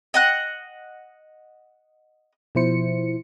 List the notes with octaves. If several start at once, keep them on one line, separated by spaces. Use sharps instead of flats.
D#5 F#5 F#6
B2 F3 E4 C5 C#7